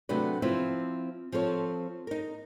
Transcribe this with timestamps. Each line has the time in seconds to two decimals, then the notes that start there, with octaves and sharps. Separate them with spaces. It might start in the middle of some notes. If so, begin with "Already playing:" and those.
0.09 C3 F#3 A3 D4 F#4 B4
0.42 F3 C4 E4 C5 E5
1.32 F3 C4 A4 C#5
2.07 D#4 A#4